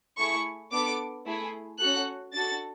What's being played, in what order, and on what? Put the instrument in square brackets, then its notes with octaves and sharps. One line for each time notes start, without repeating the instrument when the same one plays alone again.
[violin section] A3 E4 G#4 C#6
B3 D4 A4 D6
A3 E4 G#4
C#4 F#4 A4 F#6
D4 F#4 A4 A6